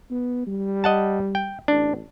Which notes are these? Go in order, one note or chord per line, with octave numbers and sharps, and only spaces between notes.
B3
G3
D#5 F#5 A5
G5
A1 D4